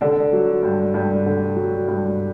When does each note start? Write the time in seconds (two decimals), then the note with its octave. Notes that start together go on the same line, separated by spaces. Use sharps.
0.01 D3 D4
0.33 F#3
0.63 G2
0.94 G2
1.26 D3
1.56 F#3
1.88 G2